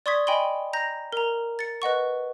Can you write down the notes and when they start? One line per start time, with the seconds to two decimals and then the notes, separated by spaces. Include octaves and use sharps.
0.06 D5 C6 C#6 D#6 G#6 B6
0.27 D#5 G5 G#5 B5 C6 G7
0.73 A#5 G6 A#6
1.13 A#4 A#5
1.59 A6 C#7
1.82 B4 D#5 F#5 C#6